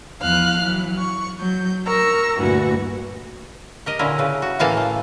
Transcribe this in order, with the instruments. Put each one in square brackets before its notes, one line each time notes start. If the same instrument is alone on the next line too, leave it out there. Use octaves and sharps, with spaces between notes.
[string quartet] E2 F3 F5 F6 F#6
E3 F#3
C#6
F#3 G6
A#4 A#5 C#6 E6
D2 G2 A#2 E3 F#4
[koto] G4 A#4 D#5
A#2 D3 C#4 E4 A#4
C#3 B4
F#4
A2 C#3 E3 A#3 F5 A5
A3